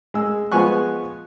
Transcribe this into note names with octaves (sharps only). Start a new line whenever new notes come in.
G#3 E6
F3 G#3 B3 G#5 C#6 F#6